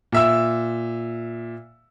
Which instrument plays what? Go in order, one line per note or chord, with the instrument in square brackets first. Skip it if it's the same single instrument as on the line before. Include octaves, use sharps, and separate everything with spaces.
[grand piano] A#2 E5 E6